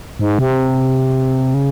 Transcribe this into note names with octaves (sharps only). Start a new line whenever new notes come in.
G#2
C3
C#3